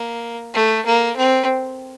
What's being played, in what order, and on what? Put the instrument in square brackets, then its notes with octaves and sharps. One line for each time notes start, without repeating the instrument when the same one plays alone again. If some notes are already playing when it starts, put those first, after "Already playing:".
Already playing: [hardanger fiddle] A#3
A3
A#3
C4